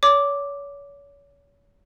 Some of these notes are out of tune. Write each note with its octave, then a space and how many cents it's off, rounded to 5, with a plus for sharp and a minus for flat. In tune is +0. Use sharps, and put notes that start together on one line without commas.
C#5 +35 D6 +0